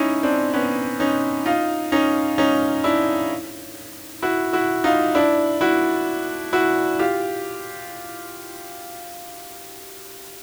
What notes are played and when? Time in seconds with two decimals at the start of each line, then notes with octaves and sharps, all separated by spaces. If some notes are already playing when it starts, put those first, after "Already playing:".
Already playing: C#4 D#4 E4
0.23 C4 D4
0.54 B3 C#4
1.00 C#4 D#4
1.46 D#4 F4
1.92 C#4 D#4
2.38 C#4 D#4
2.84 D4 E4
4.22 E4 F#4
4.53 E4 F#4
4.84 D#4 F4
5.15 D4 E4
5.61 E4 F#4
6.53 E4 F#4
6.99 F4 G4